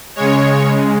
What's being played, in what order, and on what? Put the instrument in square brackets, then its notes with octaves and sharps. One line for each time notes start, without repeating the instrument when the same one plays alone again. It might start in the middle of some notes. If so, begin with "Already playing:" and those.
[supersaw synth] C#3 G#3 C#5